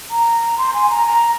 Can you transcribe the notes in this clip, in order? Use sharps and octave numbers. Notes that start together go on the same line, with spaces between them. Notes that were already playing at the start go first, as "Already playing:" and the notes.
A#5
C6
G#5
A#5
A#5